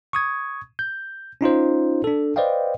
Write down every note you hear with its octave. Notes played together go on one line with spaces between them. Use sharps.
C#6 D#6 G#6
G6
C#4 D#4 F4 C5
D4 A4
B4 C5 D5 D#5 F5 G5